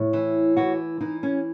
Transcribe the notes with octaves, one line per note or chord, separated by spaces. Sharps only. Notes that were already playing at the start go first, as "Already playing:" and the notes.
Already playing: A2
E3
E3 F#4
E3 D#4
C#4